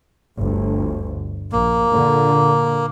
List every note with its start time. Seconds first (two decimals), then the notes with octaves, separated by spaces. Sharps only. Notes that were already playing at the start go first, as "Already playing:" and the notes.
0.37 G1 D2
1.52 A#1 A#3
1.90 A#2 D3